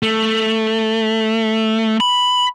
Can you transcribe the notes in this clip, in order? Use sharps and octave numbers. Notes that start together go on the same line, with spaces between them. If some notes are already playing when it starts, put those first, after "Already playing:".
A3
B5